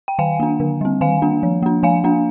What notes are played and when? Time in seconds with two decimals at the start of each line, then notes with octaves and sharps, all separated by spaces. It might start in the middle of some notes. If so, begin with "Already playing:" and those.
0.08 G5
0.19 D#3 F5 G#5
0.40 A#3 D4
0.60 D3
0.81 G3 C4
1.01 D#3 F5 G#5
1.22 A#3 D4
1.43 F3
1.63 A#3 D4
1.83 F3 F5 G#5
2.04 A#3 D4